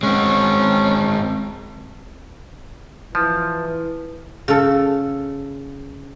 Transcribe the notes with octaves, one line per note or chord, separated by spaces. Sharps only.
G#3 C4 C#4
E3 F3
C#3 A4